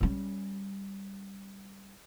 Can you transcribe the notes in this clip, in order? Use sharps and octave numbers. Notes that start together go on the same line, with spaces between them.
G3 C#4